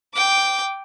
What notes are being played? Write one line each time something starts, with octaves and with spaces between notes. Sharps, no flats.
G5 D6